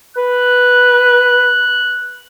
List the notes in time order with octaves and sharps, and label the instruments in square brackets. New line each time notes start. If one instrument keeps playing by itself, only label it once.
[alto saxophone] B4 [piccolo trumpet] F#6